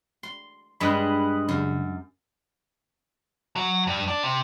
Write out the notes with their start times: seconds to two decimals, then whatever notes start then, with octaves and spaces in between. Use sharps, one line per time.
0.23 C6
0.80 G2 G#3 B5 D#6 F#6
1.49 F#2 C#3
3.56 F#3
3.87 G2
4.08 D4
4.23 C3